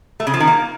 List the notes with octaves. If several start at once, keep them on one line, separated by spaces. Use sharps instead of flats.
A3
C#3
F3
D#3
A#3